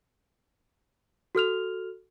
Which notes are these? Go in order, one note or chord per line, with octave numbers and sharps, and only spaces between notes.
F#4 A4 F6 F7